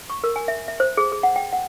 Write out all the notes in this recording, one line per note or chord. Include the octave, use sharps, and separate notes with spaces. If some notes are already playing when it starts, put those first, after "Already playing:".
C#6
A#4
G#5
E5
E5
C5
G#4
G#4
F#5
G5
F#5